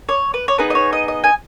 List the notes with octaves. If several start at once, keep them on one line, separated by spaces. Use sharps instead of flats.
C#5
B4
C#5
B3 D#4 G#4 B4
D#5
C#5
D#5
D#5
G#5